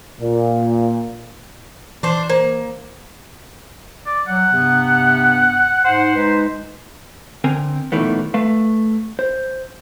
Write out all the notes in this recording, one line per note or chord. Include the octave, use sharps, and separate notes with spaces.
A#2
E3 D4 C5
A#3 C5
D5
F#3 F#5
G2 C3 B3
G#2 C5 F#5
G#3 D#4 B4
D3 C4 A#4 G#5
B1 A#2 D#3 E3 A3 B3
A3 B4 F5
C5